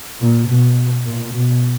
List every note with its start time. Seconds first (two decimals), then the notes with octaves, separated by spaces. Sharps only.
0.21 A#2
0.49 B2
1.06 A#2
1.33 B2